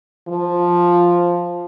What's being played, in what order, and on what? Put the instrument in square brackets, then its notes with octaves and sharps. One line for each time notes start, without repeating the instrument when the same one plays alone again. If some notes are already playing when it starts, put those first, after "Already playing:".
[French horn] F3